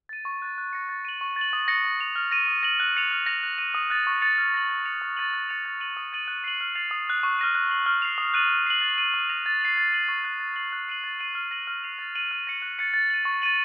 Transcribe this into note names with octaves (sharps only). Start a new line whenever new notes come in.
A6 D#7
C#6
F#6 A6
F#6
A#6 C#7
A6
D#7 F#7
C#6
A6 D#7 F#7
D#6
A#6 C#7 F#7
D#6
A#6 F7
F6
A#6 D#7
D#6
A#6 D#7 F#7
F#6
A6 C#7 F7
F6
A#6 F7
F#6
A#6 D#7
D#6
F#6 A6
C#6
A6 C#7 F7
F6
A#6 D#7 F#7
A6
C#7 F7
D#6
A6 D#7 F#7
F#6
A6 C#7 F7
A6
D#7 F#7
D#6
A6 D#7 F#7
F#6
C7 D#7 F#7
F6
A6 C7 F7
D#6
F#6 C7
C#6
F6 A#6 D#7
F#6
C7 F#7
F6
C7 F7
D#6
F#6 A6 D#7 F#7
F#6
C7 F#7
A6
D#7 F#7
D#6
A#6 F7
A6
C7 D#7 F#7
A6
D#7 F#7
C#6
F#6 A6
A6
C7 F#7
F#6
C7 D#7 F#7
A6
C7 D#7 F#7
F6
A#6 D#7 F#7
F6
C7 F7
A6
D#7 F#7
F6
A#6 C#7 F#7
F#6
A6 C#7
A6
D#7 F#7
C#6
A6 D#7 F#7